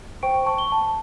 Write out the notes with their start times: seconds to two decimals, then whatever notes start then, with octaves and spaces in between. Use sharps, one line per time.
0.23 C5 G5 C#6 D7
0.46 A5 C#6
0.58 G7
0.72 A5